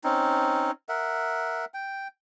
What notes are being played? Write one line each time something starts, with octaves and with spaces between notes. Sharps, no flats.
C4 C#4 D#4
A#4 E5 F#5
G5